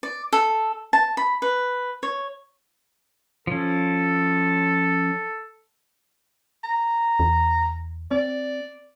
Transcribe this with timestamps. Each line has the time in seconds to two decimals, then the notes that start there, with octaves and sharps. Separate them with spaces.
0.03 D5
0.33 A4
0.93 A5
1.17 B5
1.42 B4
2.03 C#5
3.47 F3 C#4 A4
6.64 A#5
7.20 E2
8.11 C4 D5